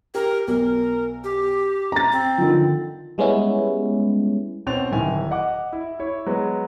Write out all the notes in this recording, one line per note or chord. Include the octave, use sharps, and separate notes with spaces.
G4 A#4
B1 A#4
G4
A#5 A6
C4
D3 D#3 F3
G3 G#3 B3 C#4 E4
B2 C4 C#4 A6 F7
D1 D#3 E4 G#5 F7
D#5 F#5 D6
E4
E4 C#5
F#3 G#3 B3